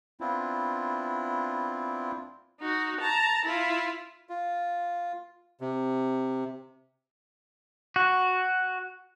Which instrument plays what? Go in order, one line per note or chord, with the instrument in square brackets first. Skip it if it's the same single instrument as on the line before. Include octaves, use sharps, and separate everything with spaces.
[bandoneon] B3 C4 D4 E4 F4
[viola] D#4 F#4
A5 A#5
E4 F4
[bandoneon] F4
C3
[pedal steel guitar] F#4